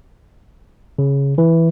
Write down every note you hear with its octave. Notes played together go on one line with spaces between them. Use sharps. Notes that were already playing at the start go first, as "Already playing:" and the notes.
C#3
E3